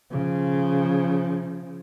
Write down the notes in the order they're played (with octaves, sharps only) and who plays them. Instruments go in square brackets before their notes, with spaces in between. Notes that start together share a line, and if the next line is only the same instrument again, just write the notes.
[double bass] C#3 F3